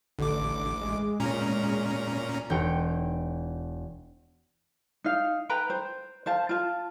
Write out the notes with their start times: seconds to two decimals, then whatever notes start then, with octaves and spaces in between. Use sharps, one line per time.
0.19 A1 D3 D6
0.81 G#3
1.20 A#2 C#4 A#5
2.50 E1 D#4 C#5 G5
5.04 D#4 F5
5.49 B4 G5 A#5
5.70 C5
6.26 C5 F5 A5
6.49 F4 A5